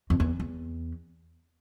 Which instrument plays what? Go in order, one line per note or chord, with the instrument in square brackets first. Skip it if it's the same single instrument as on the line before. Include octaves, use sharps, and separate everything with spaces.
[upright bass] F2
E2
E2